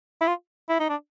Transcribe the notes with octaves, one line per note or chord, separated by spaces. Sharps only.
E4
F4
E4
D#4
D4